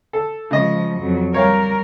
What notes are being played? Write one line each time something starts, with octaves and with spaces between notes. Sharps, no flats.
A4
C#3 F3 G#3 D#5
F2 F#3
G3 A#4 C#5 F5 G5